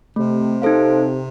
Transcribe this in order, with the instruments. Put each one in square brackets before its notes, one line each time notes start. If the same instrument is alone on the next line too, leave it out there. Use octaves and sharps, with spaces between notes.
[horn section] C3 [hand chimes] A3
[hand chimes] D#4 A4 C5 F5